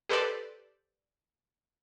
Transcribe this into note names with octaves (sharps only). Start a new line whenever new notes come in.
G4 A4 B4 C5 D5